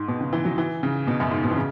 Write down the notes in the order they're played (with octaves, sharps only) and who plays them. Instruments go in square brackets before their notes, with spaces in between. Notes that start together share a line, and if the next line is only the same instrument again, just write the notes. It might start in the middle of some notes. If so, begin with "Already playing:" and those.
Already playing: [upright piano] G#2
B2
C#3
E3
F#3
E3
C#3
B2
F#2
G#2
B2
E3
C#3